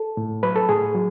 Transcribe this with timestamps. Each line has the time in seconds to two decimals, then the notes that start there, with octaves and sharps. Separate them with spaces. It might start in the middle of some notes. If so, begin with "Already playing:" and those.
Already playing: A4
0.17 A2
0.43 F#3 B4
0.56 A4
0.69 A2 G#4
0.94 F#3